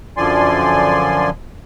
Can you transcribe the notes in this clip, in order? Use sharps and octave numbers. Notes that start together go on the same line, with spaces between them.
F#2 D3 F3 D5 G#5 C6